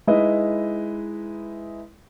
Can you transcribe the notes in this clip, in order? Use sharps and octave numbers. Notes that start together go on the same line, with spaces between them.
G#3 D#4 E4 B4 D#5